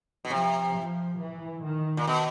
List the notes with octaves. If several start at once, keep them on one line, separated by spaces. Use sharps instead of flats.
B2
C3 F3
F3
E3
D#3
A#2
B2